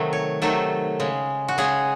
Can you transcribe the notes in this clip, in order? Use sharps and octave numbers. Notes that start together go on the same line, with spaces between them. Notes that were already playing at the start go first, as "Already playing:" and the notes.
Already playing: C3 D#3 F#3 A3
C#5
C3 D#3 F#3 A3 A4
C#3 G#3
F#4
C#3 G#3 G#4